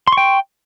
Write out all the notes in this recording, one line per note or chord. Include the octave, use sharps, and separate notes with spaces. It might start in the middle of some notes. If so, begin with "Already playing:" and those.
G5 C6 C#6